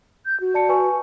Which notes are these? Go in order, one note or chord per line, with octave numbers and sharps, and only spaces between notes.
G6
F#4
D5 A5 C#7
B4 G#5 C#6